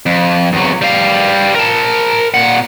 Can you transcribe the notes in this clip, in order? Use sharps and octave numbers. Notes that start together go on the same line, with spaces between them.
F2
E2 F#3
G3 F5
A#4 A5
A#2 F#5